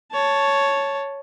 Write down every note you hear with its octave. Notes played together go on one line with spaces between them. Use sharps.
C#5 A5